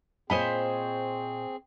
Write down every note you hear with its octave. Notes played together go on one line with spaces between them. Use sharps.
A#2 C4 G#4 C5 C#5 D#5 G#5 B5